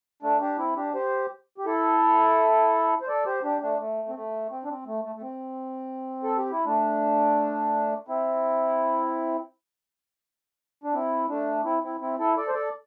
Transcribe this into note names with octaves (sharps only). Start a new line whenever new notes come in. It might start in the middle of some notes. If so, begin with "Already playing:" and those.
A3 D4
D4 G4
C4 E4
D4 G4
G4 C5
G4
E4 A4
C5
A4 D5
G4 C5
D4 G4
A3 D4
A3
C4
A3
C4
D4
C4
A3
A3
A3
C4
A4
G4
E4
A3 D4
C4 E4
D4
C4 E4
A3 D4
C4 E4
C4 E4
C4 E4
E4 A4
A4 D5
C5
A4 D5